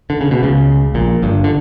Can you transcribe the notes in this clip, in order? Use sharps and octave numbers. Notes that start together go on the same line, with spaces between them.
D3
C#3
B2
C#2 C#3
A#1 A#2
G1 G2
D3